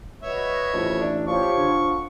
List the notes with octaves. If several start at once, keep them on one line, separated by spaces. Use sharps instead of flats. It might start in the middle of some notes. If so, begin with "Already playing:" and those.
F#4 B4 C#5 D#5 E5
A1 F2
D4
F3 G4 C5 C#5 C#6
D3
F#5